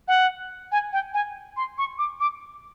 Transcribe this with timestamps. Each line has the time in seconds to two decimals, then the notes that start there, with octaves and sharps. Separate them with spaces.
0.08 F#5
0.72 G#5
0.93 G5
1.14 G#5
1.57 C6
1.78 C#6
1.99 D6
2.20 D6